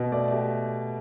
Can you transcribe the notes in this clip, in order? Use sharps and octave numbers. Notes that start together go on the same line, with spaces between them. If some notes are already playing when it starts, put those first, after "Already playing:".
Already playing: B2
A3 D5
A3 G4